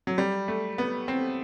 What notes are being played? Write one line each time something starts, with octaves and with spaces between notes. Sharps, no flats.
F#3
G3
A3
B3
C4